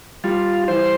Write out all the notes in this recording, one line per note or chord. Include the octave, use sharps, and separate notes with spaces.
G3 F4
E3 C5